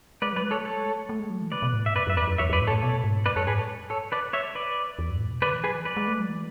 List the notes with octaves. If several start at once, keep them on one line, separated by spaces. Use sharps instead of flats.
G#3 B4 D5
F#3 B4 D5
G#3
A4 C#5
A3
G#3 A4 C#5
A3
G#3
A3
A3
G#3
F#3
E3
C#3 B4 D5
B2
A2
G#2 E5
F#2 B4 D5
F#2 E5
E2 B4 D5
F#2
E2 C#5 E5
F#2 B4 D5
A2
A4 C#5
A2
B2 A4 C#5
G#2
F#2 B4 D5
F#2 A4 C#5
G#2 G#4 B4
A2 A4 C#5
A4 C#5
B4 D5
C#5 E5
B4 D5
E2
F#2
G#2
A2
B2
D3 B4 D5
E3
F#3 G#4 B4
E3
F#3 B4 D5
G#3
A3
F#3
E3